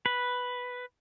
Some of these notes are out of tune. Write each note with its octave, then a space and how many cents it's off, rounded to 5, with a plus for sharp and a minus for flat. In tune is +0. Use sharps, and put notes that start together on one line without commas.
B4 +0